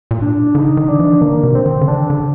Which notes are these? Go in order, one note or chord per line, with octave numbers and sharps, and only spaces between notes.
A#2
D4
D3 D#4
D#3
D4
F3
D#3 A#3
C3
C4
D#3
D3
D#3 D4
D3